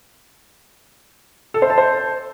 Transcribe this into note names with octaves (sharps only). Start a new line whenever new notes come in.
A4
C5
A5
C5